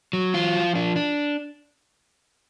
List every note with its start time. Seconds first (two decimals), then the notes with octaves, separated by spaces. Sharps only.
0.13 F#3
0.34 F4
0.55 F3
0.75 D4
0.96 D4